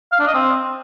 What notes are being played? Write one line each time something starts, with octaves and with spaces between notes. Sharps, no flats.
F5
D4
D#5
C4